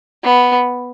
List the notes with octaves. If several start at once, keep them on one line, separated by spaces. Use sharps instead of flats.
B3